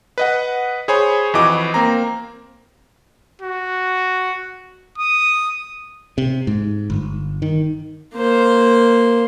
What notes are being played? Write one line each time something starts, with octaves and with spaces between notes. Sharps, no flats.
B4 D#5 F#5
G#4 C5 C#5 G#5 B5
F2 E3 F#4 D#5 D6
A#3 C4 A#5
F#4
D#6
C3
G#2
G1
D#3
A#3 C5